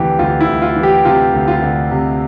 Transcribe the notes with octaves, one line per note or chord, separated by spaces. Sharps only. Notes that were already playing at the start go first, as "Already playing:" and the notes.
Already playing: D2 C3 E3 G4
D2 F4
E4
D2
F4
E3
G4
C3 F4
D2
F4
D2
C3